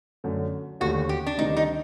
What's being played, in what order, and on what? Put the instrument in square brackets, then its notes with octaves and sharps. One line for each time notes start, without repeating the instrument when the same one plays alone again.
[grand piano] F#2 D3 A3
[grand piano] D#2 D3 A3 D4 G4 [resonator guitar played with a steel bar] F#4
[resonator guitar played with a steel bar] G4
D4
[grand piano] D2 C3 D#3 G3 [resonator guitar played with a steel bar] D#4
[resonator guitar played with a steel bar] D#4